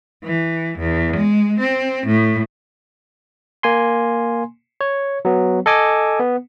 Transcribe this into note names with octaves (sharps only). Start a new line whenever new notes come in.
E3
E2
G#3
C4
A2
A#3 G#5 C6
C#5
F#3 B3
A4 D#5 G#5 D6
B3